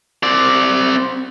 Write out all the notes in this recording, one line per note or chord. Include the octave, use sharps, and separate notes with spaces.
C4 D5